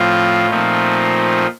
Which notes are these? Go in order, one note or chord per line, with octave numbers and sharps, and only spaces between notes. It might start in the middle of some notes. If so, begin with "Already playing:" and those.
Already playing: A2 F3 C4 F4
A#2 F3 A3 C4 D#4